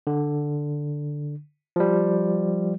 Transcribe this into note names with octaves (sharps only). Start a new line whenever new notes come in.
D3
F3 G3